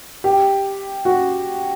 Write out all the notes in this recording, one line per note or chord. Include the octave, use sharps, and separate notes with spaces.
G4
F#4